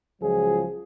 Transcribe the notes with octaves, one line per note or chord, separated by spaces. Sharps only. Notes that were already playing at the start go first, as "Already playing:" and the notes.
C#2 F3 F#3 G#4